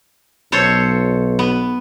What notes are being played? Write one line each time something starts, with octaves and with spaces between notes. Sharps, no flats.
B1 A4 C5 C#5
B3